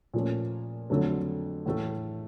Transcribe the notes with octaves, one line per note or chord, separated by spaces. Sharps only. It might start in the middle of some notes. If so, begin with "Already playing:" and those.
A#2 F3 A3 C#4
F2 D3 F#3 A3
A2 E3 A3